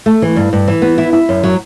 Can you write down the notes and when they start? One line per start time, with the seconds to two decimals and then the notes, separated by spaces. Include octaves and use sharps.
0.06 A3
0.22 E3
0.36 G2
0.53 G2
0.68 E3
0.82 B3
0.98 E4
1.13 E4
1.29 F#2
1.44 F#3